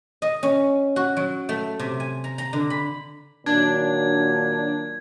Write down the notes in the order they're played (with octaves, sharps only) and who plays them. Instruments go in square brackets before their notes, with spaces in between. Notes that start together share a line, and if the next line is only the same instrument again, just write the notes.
[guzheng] D#5
C#4
F#4
F#3
A3
C3
G#5
A#5
A#5
D3
B5
[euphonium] A#2 [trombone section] D#3 F#3 [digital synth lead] D4 [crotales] G#6